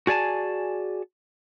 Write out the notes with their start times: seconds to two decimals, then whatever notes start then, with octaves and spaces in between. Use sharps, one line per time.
0.07 F#4 G#4 D5 G#5 A5